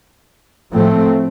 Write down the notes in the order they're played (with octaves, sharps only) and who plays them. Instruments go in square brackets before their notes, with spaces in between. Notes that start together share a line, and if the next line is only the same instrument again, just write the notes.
[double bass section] A2 F3 A3 C4